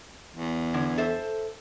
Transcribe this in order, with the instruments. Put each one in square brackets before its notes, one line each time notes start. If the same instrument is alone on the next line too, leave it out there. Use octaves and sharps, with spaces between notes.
[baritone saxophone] E2
[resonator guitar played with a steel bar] D3
A4 C5 E5